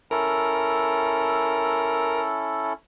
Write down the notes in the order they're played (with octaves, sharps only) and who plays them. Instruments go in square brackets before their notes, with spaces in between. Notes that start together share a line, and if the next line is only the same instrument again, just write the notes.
[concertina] C#4 E4 A4 [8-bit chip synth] A#4